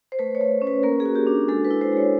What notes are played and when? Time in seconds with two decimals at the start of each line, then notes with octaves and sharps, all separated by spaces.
0.12 C5
0.19 A3 B4
0.35 C#5
0.41 A3
0.62 C#4
0.67 B4
0.83 A#3 A#4
1.00 G#4
1.06 F#4
1.15 G4
1.27 D4
1.48 G#3 A4
1.65 B4
1.71 E4
1.81 C5
1.92 G#3 C#5